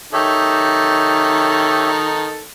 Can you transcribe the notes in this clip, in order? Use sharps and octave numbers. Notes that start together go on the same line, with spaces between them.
D#3 D#4 G4 A4 C#5 E5